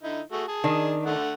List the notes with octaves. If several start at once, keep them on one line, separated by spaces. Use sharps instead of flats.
D3 D#4 E4
A3 F#4 G#4
G#4 A5
D#3 D4
D3 A3 F#5